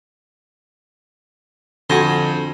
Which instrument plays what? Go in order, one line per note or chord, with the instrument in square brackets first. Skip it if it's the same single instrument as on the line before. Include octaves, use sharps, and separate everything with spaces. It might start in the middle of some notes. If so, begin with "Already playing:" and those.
[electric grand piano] F2 A#6 [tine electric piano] D3 [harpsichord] F#4 G#5 C6